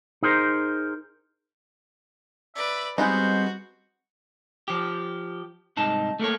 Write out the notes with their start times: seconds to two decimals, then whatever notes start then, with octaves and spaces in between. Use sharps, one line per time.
0.23 D#4 G#4 A#4 C5
2.55 B4 D5 E5
2.98 G3 G#3 B3 C4 D#4 F#4 C5
4.68 F3 G4
5.77 C2 G#2 D#4 A5
6.19 A3 A#3 A4 C#5